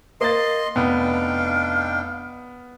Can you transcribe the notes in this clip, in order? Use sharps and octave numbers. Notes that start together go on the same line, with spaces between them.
A#3 D#5 C6 A6
F1 B3 D4 D#4 F5 G5